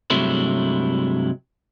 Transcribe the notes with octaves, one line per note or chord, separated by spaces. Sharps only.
G2 C3 F#3 G#3 A3 E4